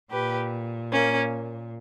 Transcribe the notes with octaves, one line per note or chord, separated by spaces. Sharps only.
A#2 G4 B4
A#3 C#4